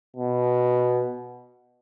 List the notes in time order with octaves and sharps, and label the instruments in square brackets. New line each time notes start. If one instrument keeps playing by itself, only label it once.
[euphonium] B2